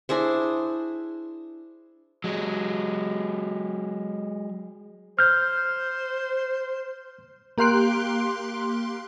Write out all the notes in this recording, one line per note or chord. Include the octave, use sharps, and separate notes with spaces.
D4 E4 G#4 C5
F#3 G#3
C5 F6 G6
A#3 G4 F5 C6 F#6 D7